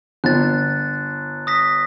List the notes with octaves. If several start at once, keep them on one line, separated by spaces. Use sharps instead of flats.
G1 F#6 A6
D#6 A#6 B6